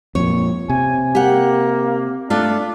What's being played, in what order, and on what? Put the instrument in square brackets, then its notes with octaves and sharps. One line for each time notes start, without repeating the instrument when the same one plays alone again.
[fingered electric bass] F2 A#2 [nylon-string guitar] C#5
[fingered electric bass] C3 [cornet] G#5
[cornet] A#3 [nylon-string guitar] G4 F#5
[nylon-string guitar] A3 F4 [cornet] D4